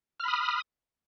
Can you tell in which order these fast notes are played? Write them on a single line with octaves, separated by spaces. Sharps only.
F6 B5 D#6